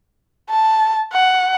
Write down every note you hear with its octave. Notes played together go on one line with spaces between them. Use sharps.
A5
F#5